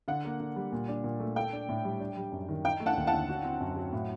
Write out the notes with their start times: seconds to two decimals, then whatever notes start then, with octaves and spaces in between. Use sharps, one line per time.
0.08 D3 F#5
0.25 A#3
0.40 D3
0.56 G3
0.72 A#2
0.88 D4
1.04 A#2
1.20 A3
1.36 A4 G5
1.53 D4
1.69 A2
1.85 G3
2.00 D4
2.17 G3
2.32 F#2
2.49 D#3
2.65 D#4 G5
2.80 A3
2.86 F#5 A5
2.97 D#2
3.07 F#5 A5
3.13 D3
3.29 F#4
3.44 C4
3.61 F#2
3.76 F#3
3.93 A2